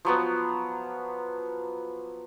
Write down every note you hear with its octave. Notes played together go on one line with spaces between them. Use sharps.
F3 F#3 B3